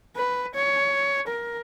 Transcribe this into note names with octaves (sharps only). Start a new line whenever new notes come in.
B4
C#5
A#4